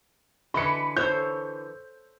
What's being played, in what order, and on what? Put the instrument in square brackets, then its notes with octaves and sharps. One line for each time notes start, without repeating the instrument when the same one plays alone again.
[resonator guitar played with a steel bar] D3 E3 B4 [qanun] D#5 [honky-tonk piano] B5 C#7
[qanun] A4 C5 C#5 [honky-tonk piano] G6